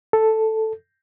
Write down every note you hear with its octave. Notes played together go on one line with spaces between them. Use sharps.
A4